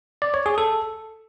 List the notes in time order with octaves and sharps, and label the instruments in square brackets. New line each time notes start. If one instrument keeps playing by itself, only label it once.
[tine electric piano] D5
C#5
G#4
A4